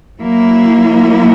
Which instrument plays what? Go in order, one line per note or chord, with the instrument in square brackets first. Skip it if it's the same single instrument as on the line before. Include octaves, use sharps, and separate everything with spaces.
[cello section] F#3 A#3 E4